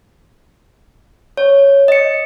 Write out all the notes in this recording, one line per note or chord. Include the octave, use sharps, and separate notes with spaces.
C#5
D#5 C#7